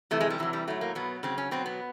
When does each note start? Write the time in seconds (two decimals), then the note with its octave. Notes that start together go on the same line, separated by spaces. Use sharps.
0.11 C3 E3 A3
0.21 G#3
0.30 G3
0.39 C3 E3 F#3
0.53 G3
0.68 A2 F#3 A3
0.81 A#3
0.95 B2 F#3 B3
1.23 C#3 F#3 C4
1.38 C#4
1.51 B2 F#3 C4
1.66 B3